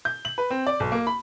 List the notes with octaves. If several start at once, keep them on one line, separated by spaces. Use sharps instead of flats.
G6
F#7
B4
C4
D5
B1
A#3
B5